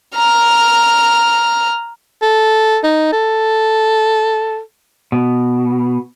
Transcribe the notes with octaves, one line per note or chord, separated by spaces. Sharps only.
A#5 F6
A4
D#4
A4
B2